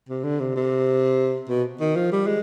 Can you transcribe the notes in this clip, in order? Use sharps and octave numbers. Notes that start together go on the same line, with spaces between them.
C3
D3
C3
C3
B2
D#3
F3
G3
G#3